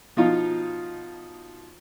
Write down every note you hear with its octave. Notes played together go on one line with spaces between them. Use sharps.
B2 F3 D#4 F4